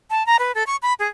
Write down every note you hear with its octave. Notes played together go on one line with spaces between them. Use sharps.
A5
A#5
B4
A4
C#6
B5
G#4